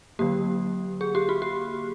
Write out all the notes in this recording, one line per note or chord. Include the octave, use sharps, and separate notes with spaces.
D3 F#3 A#3 G4
G#4
G4
F#4
G4